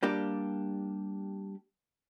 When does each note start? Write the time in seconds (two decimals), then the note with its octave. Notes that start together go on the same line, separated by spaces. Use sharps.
0.03 G3 A#3 D4 G4